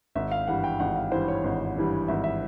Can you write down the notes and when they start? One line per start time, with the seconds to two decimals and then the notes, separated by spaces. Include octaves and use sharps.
0.15 G#1 E5
0.32 F5
0.47 G2 E3 G3 F#5
0.64 G5
0.80 G#1 F#5
0.96 F5
1.12 G2 E3 G3 C5
1.28 C#5
1.44 G#1
1.76 G2 E3 G3
2.08 G#1 E5
2.24 E5